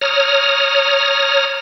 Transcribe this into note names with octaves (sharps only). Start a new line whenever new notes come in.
C#5 A#5 D#6 F6